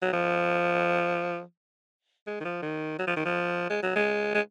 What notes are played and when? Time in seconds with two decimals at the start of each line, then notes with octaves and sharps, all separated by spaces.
0.02 F#3
0.13 F3
2.27 G#3
2.40 D#3
2.45 F3
2.62 D#3
2.99 F#3
3.07 F3
3.17 D#3
3.25 F3
3.70 G#3
3.83 F#3
3.95 G#3
4.35 G#3